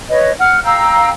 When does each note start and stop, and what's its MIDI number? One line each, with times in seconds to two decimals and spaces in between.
0.09 0.31 71
0.09 0.31 73
0.09 0.31 75
0.40 0.59 78
0.40 0.59 89
0.64 1.09 77
0.64 1.09 79
0.64 1.09 82
0.64 1.09 88